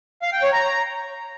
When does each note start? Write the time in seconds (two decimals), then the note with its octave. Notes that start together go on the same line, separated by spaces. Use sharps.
0.22 F5
0.33 G5
0.43 C#5
0.53 A#5